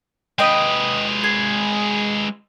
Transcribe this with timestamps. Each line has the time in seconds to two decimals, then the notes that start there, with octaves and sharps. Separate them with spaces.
0.39 G#3 B4 D#5 G5
1.24 G#4